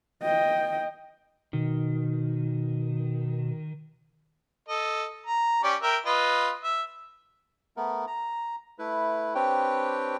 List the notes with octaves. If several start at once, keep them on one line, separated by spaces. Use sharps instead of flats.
D#5 G5
B2 D#3
A4 D#5
A#5
C#4 G4 D5
A#4 E5 G5
F4 B4 D#5
E5
A3 B3 A#4
A#5
A3 E4 B4
C4 D4 G4 B4 C#5 G5